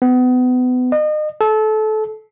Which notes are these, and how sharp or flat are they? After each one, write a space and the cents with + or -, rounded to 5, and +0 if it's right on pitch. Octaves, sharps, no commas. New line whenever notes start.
B3 +30
D#5 -35
A4 -25